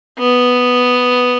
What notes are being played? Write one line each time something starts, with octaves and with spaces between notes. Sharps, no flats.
B3